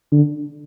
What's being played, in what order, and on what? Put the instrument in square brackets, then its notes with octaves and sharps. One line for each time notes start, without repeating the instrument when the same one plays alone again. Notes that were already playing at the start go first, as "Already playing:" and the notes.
[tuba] D3